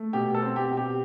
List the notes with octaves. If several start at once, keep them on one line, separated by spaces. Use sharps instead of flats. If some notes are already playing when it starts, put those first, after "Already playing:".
Already playing: A3
B2 G4
A4
C4
G4
B2
G4